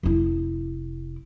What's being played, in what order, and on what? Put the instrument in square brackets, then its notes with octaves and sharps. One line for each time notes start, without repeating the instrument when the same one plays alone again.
[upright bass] F1 E4